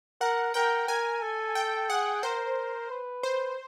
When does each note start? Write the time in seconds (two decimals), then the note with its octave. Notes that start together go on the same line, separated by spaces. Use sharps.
0.21 A#4 F#5
0.54 A#4 G5
0.88 A#4 G#5
1.22 A4
1.55 G5
1.89 G#4 F#5
2.23 A#4 C5
2.90 B4
3.23 C5